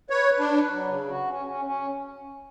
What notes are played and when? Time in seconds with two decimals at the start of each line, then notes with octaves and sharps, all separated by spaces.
0.10 B4 C#5
0.29 B4
0.39 D4
0.49 B4
0.68 F#3
0.88 C#3
1.07 F#4
1.27 C#4
1.46 C#4
1.65 C#4